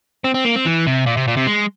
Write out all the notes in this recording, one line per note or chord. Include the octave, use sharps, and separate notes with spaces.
C4
C4
A#3
C4
E3
C3
A#2
C3
A#2
C3
G#3